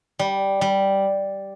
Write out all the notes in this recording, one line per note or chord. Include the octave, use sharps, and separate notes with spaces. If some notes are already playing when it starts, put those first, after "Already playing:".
G3
G3